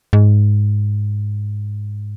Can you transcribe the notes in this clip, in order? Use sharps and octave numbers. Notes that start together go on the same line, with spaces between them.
G#2